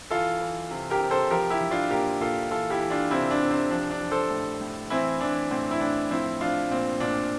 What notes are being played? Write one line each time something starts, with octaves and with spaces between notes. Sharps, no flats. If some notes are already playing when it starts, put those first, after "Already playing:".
E3 F4 A4
E3
C3
G4 A#4
C3
A4 C5
F3 G4 A#4
E4 G4
F3
D4 F4
A#2 G4 A#4
A#2 F4 A4
E3 F4 A4
E4 G4
E3
D4 F4
C3 C4 E4
D4
C3
C4
F3 D4
D4
F3
A4 C5
A2
A2
E3 C4 E4
E3 D4
A2 C4
E4
A2 D4
F3 C4 E4
F3 D4 F4
A#2 C4
A#2 D4